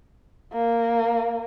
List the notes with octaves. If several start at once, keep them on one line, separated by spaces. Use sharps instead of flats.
A#3